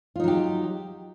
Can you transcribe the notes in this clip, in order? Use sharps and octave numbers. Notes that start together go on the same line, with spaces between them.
F#3 D#4 F4 G4